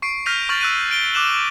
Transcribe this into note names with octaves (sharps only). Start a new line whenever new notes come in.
C#6 C7 D7
F6 G6 A#6 B6 D#7 F7
C#6 F6 G6 A6 F#7
E6 F#6 D#7
G6 D7 G7
D6 F#6 E7 F#7